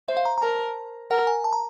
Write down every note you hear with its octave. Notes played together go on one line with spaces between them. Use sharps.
C5 E5
F5
A#5
A#5
A#4 A5
A#4 F#5
G#5
A5
A#5